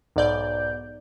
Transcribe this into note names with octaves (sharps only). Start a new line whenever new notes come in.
B1 G#2 D5 G6